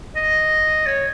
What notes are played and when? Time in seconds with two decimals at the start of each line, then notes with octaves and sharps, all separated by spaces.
0.16 D#5
0.86 C#5